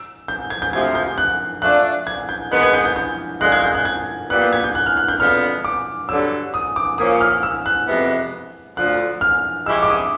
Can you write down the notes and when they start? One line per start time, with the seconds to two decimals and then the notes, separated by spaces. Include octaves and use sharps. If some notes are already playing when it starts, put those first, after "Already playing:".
Already playing: E6
0.28 G6
0.50 G#6
0.62 G6
0.73 D2 C3 F3 G#6
0.95 G6
1.18 F#6
1.62 F3 A3 D4 F#6
2.07 G#6
2.29 G6
2.51 G#2 D#3 G#3 B3 F#6
2.63 G#6
2.74 G6
2.85 G6
2.96 G6
3.41 F#2 D3 F3 G#3 F#6
3.52 G#6
3.63 G6
3.75 F#6
3.85 G#6
4.30 A#2 G3 B3 F#6
4.41 G6
4.53 G#6
4.64 G6
4.75 F#6
4.86 F6
4.97 F#6
5.08 G6
5.20 F2 D3 F3 G#3 B3 F6
5.64 D6
6.09 G2 D3 F#3 E6
6.54 D#6
6.76 D6
6.98 A#2 F3 A#3 C#4 D#6
7.21 F6
7.43 E6
7.66 F#6
7.88 F2 C3 E3 G#3 B3
8.77 D2 D3 F3 F#6
9.21 F6
9.66 F3 G#3 C#4 E4 G4 E6
9.83 D6
9.89 D#6